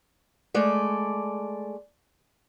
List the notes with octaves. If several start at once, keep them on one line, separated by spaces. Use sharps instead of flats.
G#3 A3 D5